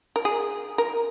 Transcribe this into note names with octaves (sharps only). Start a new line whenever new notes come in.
A#4
G#4
A#4